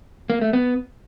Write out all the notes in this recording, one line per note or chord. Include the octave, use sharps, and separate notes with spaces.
A#3
A3
B3